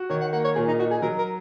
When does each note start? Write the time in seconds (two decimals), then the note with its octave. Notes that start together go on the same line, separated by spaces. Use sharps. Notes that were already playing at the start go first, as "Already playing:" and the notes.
Already playing: F#4
0.10 D#3 C#5
0.21 F#5
0.33 A#3 F#5
0.44 C#5
0.55 A#2 G#4
0.68 D#4
0.79 D#4 F#4
0.91 G#4
1.02 F#3 A#4
1.18 A#4